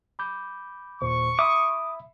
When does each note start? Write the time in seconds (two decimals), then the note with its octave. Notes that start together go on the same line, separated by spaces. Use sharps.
0.19 B5 D6 G6
1.02 D#2 A#2 C5 C#6
1.39 E5 B5 D6 D#6